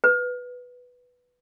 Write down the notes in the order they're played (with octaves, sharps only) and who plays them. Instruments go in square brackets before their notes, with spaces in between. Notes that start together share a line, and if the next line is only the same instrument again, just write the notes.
[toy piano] B4